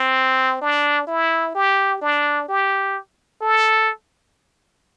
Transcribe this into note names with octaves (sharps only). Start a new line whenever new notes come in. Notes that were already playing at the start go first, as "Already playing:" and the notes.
Already playing: C4
D4
E4
G4
D4
G4
A4